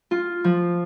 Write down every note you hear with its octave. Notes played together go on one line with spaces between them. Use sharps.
F4
F3